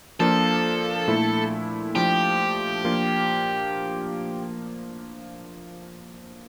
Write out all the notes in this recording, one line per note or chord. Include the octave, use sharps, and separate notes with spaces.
F3 A#3 D4 F4 A4
A#2 A3 E4
F3 A3 D4 F4 G4
F3 A#3 D4 F4